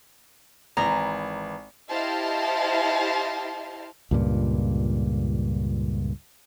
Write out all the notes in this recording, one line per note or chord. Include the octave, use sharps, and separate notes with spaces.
G#1 E3 A#5
E4 G4 C5 D#5 F5 A5
C#2 G2 A#2